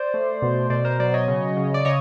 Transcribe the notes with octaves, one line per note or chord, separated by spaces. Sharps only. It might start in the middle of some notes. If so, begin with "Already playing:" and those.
Already playing: C5 D5
A3
B2
B2 C5 D5
A#4 C5
F#3 C5 D5
C#5 D#5
C#3
C#3
D5
C#3 C#5 D#5